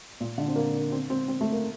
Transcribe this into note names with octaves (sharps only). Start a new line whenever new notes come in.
A#2
D3
C4
A#3
C4
C4
C4
A3
A#3